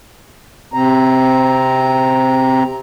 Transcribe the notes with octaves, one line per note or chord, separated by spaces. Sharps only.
C3 C4 A#5